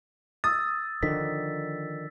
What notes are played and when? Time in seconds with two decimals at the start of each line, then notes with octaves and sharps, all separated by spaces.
0.44 D#6 E6 A6
1.03 D3 D#3 F3 B6